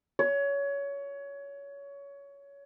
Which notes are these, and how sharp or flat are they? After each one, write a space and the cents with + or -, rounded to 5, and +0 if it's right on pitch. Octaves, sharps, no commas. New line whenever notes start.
C#5 +20